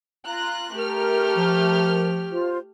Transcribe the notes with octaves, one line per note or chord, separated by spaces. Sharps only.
F4 A#5 F#6
A3 G4 A#4 F6
F3
F4 C5